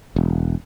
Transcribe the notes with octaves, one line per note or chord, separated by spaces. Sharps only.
E1